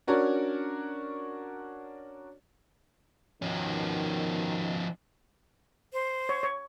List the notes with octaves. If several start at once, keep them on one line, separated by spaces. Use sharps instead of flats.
C#4 D4 F#4 A#4 C#5 D5
B2 D#3 F3 C#4
C5
C#5
C#5